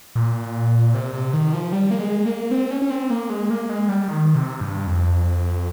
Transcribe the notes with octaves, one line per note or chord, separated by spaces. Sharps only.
A#2
C3
C3
D#3
F3
G3
A#3
G#3
A#3
C4
C#4
C#4
C4
A#3
G#3
A#3
G#3
G3
D#3
C3
G2
F2